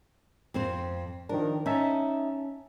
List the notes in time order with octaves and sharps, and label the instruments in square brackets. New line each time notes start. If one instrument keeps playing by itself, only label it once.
[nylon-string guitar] F2 C4 C5
[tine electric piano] D#3 F3 D4 [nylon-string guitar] A#4
[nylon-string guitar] C#4 [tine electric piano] D#4 E5 A5